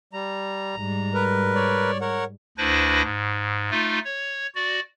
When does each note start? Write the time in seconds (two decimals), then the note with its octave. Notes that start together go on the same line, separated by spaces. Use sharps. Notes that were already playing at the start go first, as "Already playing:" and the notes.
0.13 G3 A#5
0.77 G#2 G3
1.14 A#4 B4
1.55 C#5 D5
2.01 A#4 C#5 F#5
2.58 D2 D4 E4 B4 C5 A#6
3.03 G#2
3.71 A3 D#4 F4
4.05 C#5
4.55 F#4 D5